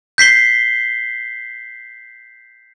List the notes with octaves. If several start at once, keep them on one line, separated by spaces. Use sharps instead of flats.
G6 B6 C7 G7